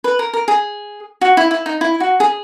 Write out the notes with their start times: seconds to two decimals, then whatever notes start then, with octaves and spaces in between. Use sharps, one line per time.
0.04 B4
0.19 A#4
0.33 A#4
0.48 G#4
1.21 F#4
1.37 E4
1.51 E4
1.66 D#4
1.81 E4
2.00 F#4
2.20 G#4